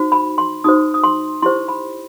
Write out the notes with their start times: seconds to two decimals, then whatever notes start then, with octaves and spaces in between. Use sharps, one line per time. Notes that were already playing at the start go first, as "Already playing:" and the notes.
Already playing: D#4 F#4 C5
0.12 B5
0.38 C6
0.64 D#4 F#4 C5 D#6
0.94 D#6
1.04 C6
1.42 E4 G4 C5 C6
1.68 B5